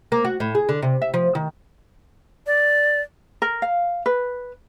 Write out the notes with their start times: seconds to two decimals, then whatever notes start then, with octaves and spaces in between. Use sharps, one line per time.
0.12 A#3
0.25 F#4
0.40 A2
0.55 G#4
0.69 D3
0.83 C3
1.02 E5
1.14 F3
1.35 D#3
2.47 D5
3.42 A#4
3.62 F5
4.06 B4